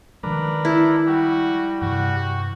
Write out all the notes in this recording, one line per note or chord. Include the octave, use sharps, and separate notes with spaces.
D#3 F3 G#3 D4 A#4 B4
E4 A4
G3 F#4
G2 C3 E3 F#4